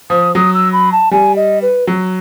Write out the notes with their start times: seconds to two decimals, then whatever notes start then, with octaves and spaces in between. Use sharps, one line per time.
0.10 F3 D#6
0.35 F#3 D#6
0.54 E6
0.73 B5
0.92 A5
1.11 G3 G#5
1.36 D#5
1.62 B4
1.87 F#3